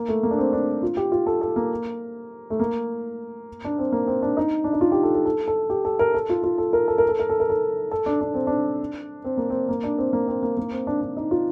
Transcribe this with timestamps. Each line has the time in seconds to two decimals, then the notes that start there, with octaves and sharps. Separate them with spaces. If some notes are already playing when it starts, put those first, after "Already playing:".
Already playing: A#3
0.08 A3
0.23 A#3
0.31 D4
0.38 C4
0.53 D4
0.83 F4
0.97 G4
1.12 F4
1.27 A4
1.41 A4
1.56 A#3
2.50 A3
2.60 A#3
3.65 D4
3.79 C4
3.92 A#3
4.07 C4
4.22 D4
4.37 D#4
4.64 D4
4.73 D#4
4.81 F4
4.92 G4
5.03 A4
5.15 A4
5.25 A4
5.48 A4
5.70 G4
5.85 A4
5.99 A#4
6.14 A4
6.29 F4
6.44 F4
6.58 A4
6.73 A#4
6.88 A4
6.98 A#4
7.09 A4
7.19 A#4
7.30 A4
7.40 A#4
7.50 A4
7.91 A4
8.06 D4
8.21 D4
8.34 C4
8.47 D4
9.24 C4
9.37 A#3
9.50 C4
9.69 A#3
9.83 D4
9.98 C4
10.13 A#3
10.28 C4
10.43 A#3
10.57 A#3
10.72 C4
10.87 D4
11.01 D4
11.17 D#4
11.31 F4